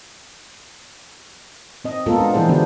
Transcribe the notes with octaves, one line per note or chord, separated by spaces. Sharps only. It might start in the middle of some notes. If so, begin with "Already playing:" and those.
C4 D#5
G#3 A#3 B3 F4 A4 A#4
D4
E3 F3 E4 G#4 C5
D3 B3 D4 G4 C5